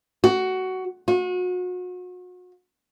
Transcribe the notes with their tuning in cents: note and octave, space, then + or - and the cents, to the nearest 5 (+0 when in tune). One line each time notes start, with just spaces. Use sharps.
F#4 +15
F#4 -35